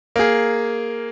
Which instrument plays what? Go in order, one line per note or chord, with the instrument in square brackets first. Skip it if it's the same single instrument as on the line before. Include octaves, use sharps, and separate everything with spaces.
[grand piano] A#3 G#4